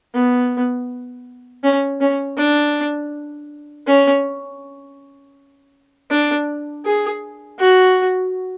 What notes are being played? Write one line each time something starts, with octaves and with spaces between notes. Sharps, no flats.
B3
C#4
C#4
D4
C#4
D4
G#4
F#4